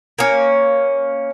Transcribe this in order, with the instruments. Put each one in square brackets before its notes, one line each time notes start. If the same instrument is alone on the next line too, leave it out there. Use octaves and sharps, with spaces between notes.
[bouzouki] A#3 C#4